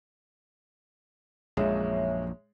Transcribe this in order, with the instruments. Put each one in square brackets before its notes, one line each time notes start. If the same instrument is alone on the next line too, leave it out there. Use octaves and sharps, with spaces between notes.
[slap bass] A#1 F#2 [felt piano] G#3 [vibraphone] C#5 E5